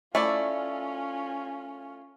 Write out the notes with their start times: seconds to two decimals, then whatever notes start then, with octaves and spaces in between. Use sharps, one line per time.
0.15 A3 C#4 E4 F4 D5